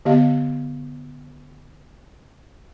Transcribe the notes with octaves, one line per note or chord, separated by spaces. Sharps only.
D3 B3 G4 D#5 F5